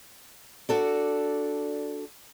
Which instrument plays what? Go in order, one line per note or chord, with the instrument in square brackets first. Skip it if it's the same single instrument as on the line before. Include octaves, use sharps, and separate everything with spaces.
[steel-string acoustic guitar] D4 F#4 A4 D5